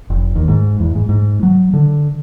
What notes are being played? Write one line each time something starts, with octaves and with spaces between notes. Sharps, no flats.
F1
D#2
G#2
E2
G#2
G#2
F#3
D3